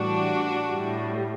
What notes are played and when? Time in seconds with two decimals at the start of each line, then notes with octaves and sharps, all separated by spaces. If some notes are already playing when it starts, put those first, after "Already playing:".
Already playing: A2 E3 G3 D4 F#4
0.69 A2 G3